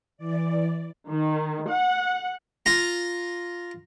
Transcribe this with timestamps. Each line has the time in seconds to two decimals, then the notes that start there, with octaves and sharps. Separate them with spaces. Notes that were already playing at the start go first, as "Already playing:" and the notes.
0.17 E3 D5
1.09 D#3
1.69 F#5
2.66 F4 A#5